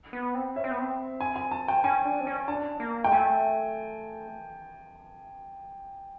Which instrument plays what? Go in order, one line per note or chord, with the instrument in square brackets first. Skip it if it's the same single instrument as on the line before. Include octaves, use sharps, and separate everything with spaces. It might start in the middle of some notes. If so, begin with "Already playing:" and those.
[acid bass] B3
C4
[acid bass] C#4 [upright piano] E5
[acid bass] C4
B3
C4
[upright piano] G#5
G#5
A5
G5
[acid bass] C#4 [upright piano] G#5
[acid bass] D4
C4
C#4
[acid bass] D4 [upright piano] A5
[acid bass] A#3
[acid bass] G#3 [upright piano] G5
[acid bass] A3 [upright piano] G#5